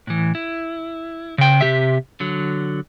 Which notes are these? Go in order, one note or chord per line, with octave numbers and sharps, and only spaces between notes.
A2 E3
E4
C#3 G5
C3 G4 E5
D3 F#3